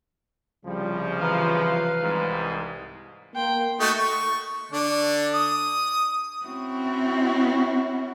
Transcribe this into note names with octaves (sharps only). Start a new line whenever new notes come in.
C2 C#3 F3 G3
E3 B4 F5 A#5 F6
C2 G#2
A#3 G5 C6
A3 D#4 F#4
C#6
D3 D4
D#6
C4 C#4 E4 F#4